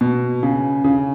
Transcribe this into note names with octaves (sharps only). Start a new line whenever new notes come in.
B2
C#3
C#3